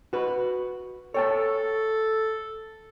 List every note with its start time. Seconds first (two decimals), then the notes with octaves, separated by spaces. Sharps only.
0.13 F#4 B4
1.14 A4 C#5 G5 A5